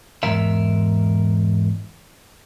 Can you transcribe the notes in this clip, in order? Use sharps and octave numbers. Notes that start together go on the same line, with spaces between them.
E2 G#2 A#4 E5